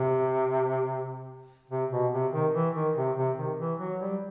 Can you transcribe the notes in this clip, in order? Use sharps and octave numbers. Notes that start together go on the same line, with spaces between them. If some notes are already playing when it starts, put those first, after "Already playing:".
Already playing: C3
C3
B2
C3
D#3
E3
D#3
C3
C3
D#3
E3
F#3
G3